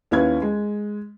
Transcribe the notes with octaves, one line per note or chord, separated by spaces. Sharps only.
D#2 C#4 E4 B4 F5 G#6
G#3